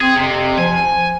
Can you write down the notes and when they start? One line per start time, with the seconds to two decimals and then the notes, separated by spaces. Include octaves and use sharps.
0.01 C4 G#4
0.17 F2 C3
0.58 F3 G#5